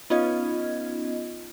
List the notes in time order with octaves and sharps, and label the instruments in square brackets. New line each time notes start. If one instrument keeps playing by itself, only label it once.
[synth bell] B3 C#4 D#4 F4 D#5 G#6